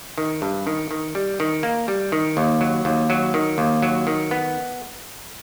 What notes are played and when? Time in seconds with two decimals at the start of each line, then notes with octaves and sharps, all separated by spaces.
0.18 D#3
0.42 G2
0.67 D#3
0.91 D#3
1.15 G3
1.40 D#3
1.63 A#3
1.88 G3
2.12 D#3
2.37 D#2
2.61 F#3
2.85 D#2
3.10 F#3
3.34 D#3
3.58 D#2
3.82 F#3
4.07 D#3
4.31 B3